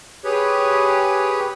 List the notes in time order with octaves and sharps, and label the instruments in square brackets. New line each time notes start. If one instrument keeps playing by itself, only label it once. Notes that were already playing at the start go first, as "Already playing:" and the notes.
[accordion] G4 G#4 B4 C#5